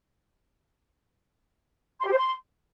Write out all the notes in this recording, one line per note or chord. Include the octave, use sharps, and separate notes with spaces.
C6
G4
C5
C6